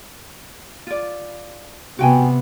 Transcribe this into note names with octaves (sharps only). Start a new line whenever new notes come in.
F4 D5
C3 B3 F#4 G5 G#5